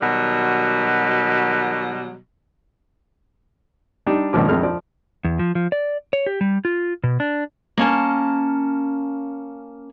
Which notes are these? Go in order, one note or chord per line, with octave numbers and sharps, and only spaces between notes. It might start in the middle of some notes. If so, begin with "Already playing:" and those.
B2 D#3 F#3 G3
G3 D4 D#4
G#1 C#2 A#2 F3 D6
A#1 F2 G#3 F6
F3 D5
E2
F3
F3
D5
C#5
G4
G3
F4
B2
D4
A#3 C#4 A5